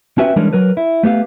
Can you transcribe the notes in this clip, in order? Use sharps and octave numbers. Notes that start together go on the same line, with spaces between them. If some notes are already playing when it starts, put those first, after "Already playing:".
C4 C#4 F#4 G4 B4 E5
E3 G3 G#3 C#4 D4 A#4
F#3 A#4 B4
E4
A3 B3 G4 F5